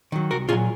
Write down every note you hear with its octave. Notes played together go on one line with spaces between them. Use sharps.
D#3 F#3
C2 F#4 A#4
A#2 F#3 F4 G#4